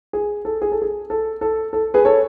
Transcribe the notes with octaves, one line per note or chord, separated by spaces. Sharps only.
G#4
A4
G#4
A4
G#4
A4
A4
A4
G#4 B4
A4 C#5